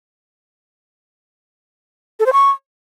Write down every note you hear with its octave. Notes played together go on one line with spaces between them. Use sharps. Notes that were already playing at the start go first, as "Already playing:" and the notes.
A4
C5
C#6